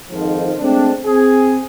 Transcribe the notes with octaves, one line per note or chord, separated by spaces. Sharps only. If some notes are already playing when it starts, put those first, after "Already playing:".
F2 G#2 D#3 F3
G#3 A3 C4 D4
C4 G#4